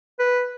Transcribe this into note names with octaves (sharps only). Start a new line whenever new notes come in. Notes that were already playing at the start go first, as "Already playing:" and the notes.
B4